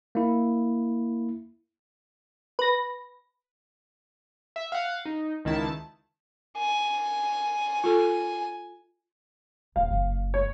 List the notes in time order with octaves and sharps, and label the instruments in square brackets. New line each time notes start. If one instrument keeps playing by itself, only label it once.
[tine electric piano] A#3 E4
[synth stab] B4 A#6
[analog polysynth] E5
F5 F#5
D#4
C#2 D#3 E4 A5
[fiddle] G#5
[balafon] F4 A4
[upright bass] D#1 [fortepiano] F5
[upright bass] F#1 F#2
[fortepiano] C#5